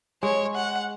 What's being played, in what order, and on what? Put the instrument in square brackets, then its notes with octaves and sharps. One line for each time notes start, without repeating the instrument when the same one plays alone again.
[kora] G#3 [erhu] C#5
[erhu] F#5